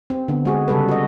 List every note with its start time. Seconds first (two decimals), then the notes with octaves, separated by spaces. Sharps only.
0.10 C4
0.28 D3 B3
0.45 G#3 F#4 G#4
0.68 C#3 G3 A4 B4
0.89 F#4 D#5